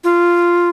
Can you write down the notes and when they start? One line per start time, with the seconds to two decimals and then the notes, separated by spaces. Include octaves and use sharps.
0.04 F4